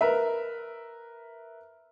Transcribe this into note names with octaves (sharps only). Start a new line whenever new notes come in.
A#4 B4 E5